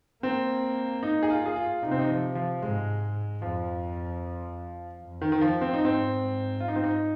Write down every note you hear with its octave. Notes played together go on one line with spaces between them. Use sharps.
A#3 C4
D#4
G#4
F4
G#4
F4
C3 D#4
C4
D#4
F3
F3
G#2 G#3
F2 F3
F2
D#3
D#3
F3
C4
D#4
G#2 C4
F4
D#4
C4
D#4